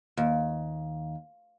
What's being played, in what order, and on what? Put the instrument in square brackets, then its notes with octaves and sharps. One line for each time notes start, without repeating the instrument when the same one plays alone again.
[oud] D#2